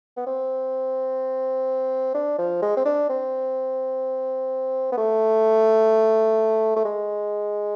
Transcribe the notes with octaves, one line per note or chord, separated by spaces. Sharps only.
B3
C4
D4
F3
G#3
C4
D4
C4
B3
A3
A3
G#3